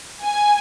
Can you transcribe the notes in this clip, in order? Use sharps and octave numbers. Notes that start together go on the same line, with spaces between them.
G#5